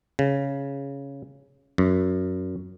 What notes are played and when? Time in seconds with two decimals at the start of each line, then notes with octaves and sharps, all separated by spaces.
0.19 C#3
1.78 F#2